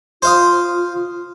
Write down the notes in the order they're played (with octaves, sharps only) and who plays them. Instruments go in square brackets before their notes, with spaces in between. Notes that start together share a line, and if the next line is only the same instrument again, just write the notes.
[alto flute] F4 [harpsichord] C5 F5 D#6